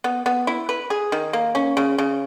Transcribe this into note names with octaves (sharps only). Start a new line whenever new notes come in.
B3
B3
E4
B4
G#4
D#3
A#3
C#4
C#3
C#3